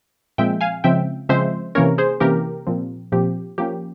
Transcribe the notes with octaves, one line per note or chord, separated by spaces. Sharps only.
A#2 F3 G#3 C4 E5 G5
F5 G#5
C#3 F3 G#3 C4 E5 G5
C#3 F3 G#3 C4 C5 E5
C3 E3 A#3 C#4 A#4 C#5
G#4 C5
C3 E3 A#3 C#4 G4 A#4
A#2 F3 C4
A#2 F3 C4 G4
F3 A#3 C#4 G4